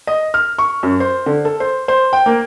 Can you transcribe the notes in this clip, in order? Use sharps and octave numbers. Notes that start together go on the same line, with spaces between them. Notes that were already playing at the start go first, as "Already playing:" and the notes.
D#5
F6
C#6
F#2
C5
D3
A4
C5
C5
G5
A#3